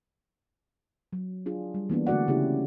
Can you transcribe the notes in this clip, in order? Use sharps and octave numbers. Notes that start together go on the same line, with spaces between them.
F#3
D4 F4 G#4
G3
E3 A#3 B3 D4
D3 A3 F#4 D5 F#5
C#3 C#4 E4 G4